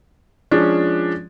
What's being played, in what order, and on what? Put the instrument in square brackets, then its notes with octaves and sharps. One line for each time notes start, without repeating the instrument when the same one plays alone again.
[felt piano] F3 G#3 C#4 D4